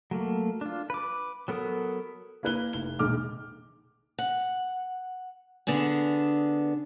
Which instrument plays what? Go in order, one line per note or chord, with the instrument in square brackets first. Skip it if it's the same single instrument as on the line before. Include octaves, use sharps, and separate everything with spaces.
[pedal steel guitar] F#3 A3 A#3
D4 F4
B4 D6
F#3 B3 A4 A#4 D#6
[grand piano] A#3 E4 B4 F#6 G7
F1 G7
E1 A#1 D#3 D6 F6
[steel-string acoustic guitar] F#5
D3 B3 D4 G#4